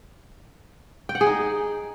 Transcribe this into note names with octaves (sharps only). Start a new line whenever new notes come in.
G5
F#5
G#4
D#4